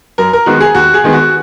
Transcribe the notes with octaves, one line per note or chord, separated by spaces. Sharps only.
F#2 A#4
A#4
D#3 G#3 B3 F#4
G#4
D#2 F#4
G#4
D#3 G#3 B3
F#4